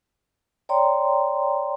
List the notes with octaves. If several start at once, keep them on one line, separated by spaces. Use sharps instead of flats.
C#5 D5 G5 A#5 C6